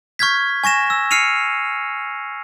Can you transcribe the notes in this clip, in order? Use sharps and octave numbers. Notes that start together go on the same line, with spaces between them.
C#6 F6 G6 G#6 B6
G#5 C#6 A#6 E7
E6
F6 C7 C#7 D#7 F7